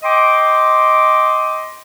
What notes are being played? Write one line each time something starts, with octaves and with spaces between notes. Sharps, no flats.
D#5 G5 C6 D6